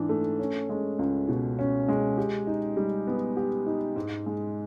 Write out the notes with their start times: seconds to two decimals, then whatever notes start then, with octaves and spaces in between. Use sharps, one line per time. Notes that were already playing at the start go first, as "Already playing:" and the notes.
Already playing: G#2 E3 D4
0.09 A3
0.39 C#4
0.69 G#3
0.99 C#2
1.28 B2
1.59 C#4
1.88 G#3
2.18 G4
2.47 D#4
2.77 G3
3.07 B3
3.37 G4
3.66 D#4
3.96 G#2
4.26 G#3